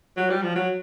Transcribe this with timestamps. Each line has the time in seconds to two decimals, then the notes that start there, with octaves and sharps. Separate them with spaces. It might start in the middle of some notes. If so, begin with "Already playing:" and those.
0.17 F#3
0.30 G3
0.43 F3
0.55 F#3